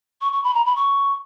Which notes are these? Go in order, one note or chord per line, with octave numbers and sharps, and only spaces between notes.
C#6
C#6
B5
A#5
B5
C#6